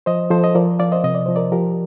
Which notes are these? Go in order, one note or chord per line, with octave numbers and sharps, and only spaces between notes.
F3 C5 D#5
F3 A4 C5
D#5
F3 A#4 D5
F3 D5 F5
C5 D#5
C3 D#5
D5
F3 C5
A#4 D5
F3 G4 A#4